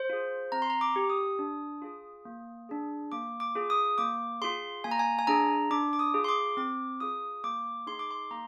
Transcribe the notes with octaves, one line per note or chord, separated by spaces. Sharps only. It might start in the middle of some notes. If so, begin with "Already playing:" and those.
Already playing: C5
F4 G#4
C4 A#5
C6
A#5
D6
G4
D#6
D4
F4 G#4
A#3
D4 G#4
A#3 D6
D6
F4 G#4
D#6
A#3 D6
F4 G#4 C6
A#3 G#5
A#5
G#5
G#5
D4 G#4 A#5
D4 D6
D6
D#6
F4 G#4
C6
D6
C4 D6
F4 G#4 D#6
A#3 D6
D#4 G#4 C6
D6
C6
A#3 A#5